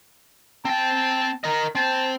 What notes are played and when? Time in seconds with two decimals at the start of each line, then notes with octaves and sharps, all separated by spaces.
0.65 C4 G5 A5
1.44 A#4 D#5
1.75 C4 A5